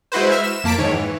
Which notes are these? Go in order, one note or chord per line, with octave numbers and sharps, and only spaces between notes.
G#3 E4 F#4 B4 C5
E5 F6
E7
F2 A#3 A5 B6 D7
G#2 D#3 C#5
E3